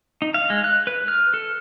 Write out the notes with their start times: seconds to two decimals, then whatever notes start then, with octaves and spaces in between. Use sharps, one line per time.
0.22 D#4
0.34 F5
0.50 G#3
0.64 F#6
0.87 B4
1.08 F6
1.34 A4